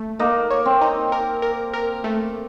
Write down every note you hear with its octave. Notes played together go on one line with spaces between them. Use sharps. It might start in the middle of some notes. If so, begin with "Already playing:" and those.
Already playing: A3
A#3 D#4
C#5
C4
D#4
A#4
A#4
A#4
A3